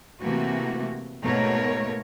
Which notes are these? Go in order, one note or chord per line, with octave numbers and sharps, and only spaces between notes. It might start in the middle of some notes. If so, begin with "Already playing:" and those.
C3 E3 A3 A#3 F#4
G#2 B2 A3 A#3 A#4 C#5